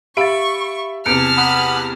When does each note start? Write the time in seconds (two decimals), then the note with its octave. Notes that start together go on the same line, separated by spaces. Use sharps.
0.17 G4 E5 F5 B5 C#6 A6 D7
1.06 E2 C3 A5 F6 C#7 D7
1.38 F#5 B5 D#6